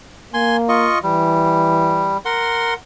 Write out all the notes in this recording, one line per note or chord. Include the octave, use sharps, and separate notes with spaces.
A#3 G#5 C6
F4 D#5 C#6
E3 G3
A#4 F#5 C6